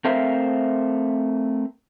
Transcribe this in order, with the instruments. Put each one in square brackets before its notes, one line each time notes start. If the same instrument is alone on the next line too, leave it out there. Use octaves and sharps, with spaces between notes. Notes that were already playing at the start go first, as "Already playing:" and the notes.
[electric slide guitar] A3 C4 A#4 C5 E5 F5